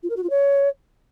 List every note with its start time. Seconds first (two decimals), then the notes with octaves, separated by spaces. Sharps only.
0.03 F4
0.09 A#4
0.16 F#4
0.23 F4
0.30 C#5